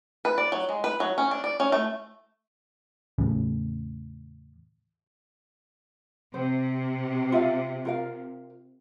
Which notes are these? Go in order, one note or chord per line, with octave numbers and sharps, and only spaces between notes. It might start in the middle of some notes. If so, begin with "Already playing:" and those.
B4
D5
F#3
G#3
B4
F#3
C#4
D4
D5
C#4
A3
E2 A2 C#3
C3 C5
F4 E5 F5
F4 A#4 F5